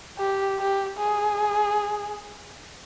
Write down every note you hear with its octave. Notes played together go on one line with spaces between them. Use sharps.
G4
G4
G#4